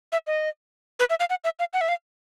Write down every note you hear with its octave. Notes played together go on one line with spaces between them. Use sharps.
E5
D#5
B4
E5
F5
F#5
E5
F5
F#5
E5
F5